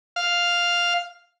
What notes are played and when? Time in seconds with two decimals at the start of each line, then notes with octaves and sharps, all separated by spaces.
0.16 F5